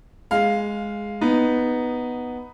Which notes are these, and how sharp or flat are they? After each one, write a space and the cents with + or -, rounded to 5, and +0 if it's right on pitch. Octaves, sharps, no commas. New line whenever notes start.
G#3 +0 F5 +0
B3 +0 D#4 +0